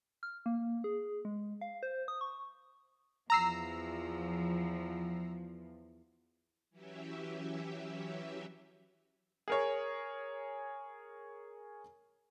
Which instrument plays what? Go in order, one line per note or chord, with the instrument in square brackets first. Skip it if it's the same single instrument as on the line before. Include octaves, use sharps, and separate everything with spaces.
[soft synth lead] F6
A#3
G#4
G#3
F5
C5
D#6
C#6
[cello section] E2 F3 [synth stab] A#5 E6 C7
[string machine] E3 F#3 C#4 G4 E5
[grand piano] G#4 A#4 C#5